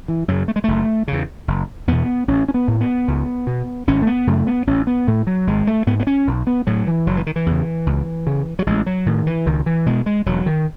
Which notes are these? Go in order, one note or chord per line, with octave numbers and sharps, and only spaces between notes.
E3
F#2 C#3 F#3
A3
G#3
F#1 A3
E2 C#3
F#1
E2 B2 B3
A1 C#4
C#4
B3
A2
B3
C#2
B2
G#1 C#4
A3
B3
F#2 C#3 A3
B3
A1 C#4
B3
A2 A3
F#3
G#1 G#3
A3
G#2 B3
B3
C#4
B1
B3
A2 F#3
E3
F#1 F#3
E3
D#3
E3
E2
C#3
C#2
C#3
F#3
A1 G#3
F#3
A2 D#3
E3
C#2 D#3
E3
B2 G#3
G#3
E1 F#3
D#3